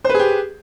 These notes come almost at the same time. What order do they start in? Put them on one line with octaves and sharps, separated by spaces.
C5 B4 G#4 G4